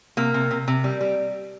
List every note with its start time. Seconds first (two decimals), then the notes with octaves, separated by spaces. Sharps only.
0.17 C3 A#3
0.34 C3
0.51 C3
0.68 C3
0.84 G3
1.01 G3